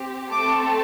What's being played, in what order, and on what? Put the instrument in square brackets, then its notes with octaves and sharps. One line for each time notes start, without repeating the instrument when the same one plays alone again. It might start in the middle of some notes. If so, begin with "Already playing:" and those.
Already playing: [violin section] C4 G4
A3 C4 A4 D6